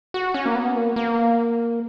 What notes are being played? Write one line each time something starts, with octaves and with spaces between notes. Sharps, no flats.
F#4
C#4
A#3
B3
A#3
A#3